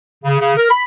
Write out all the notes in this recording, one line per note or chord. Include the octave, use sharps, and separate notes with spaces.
C#3
C#3
A#4
B5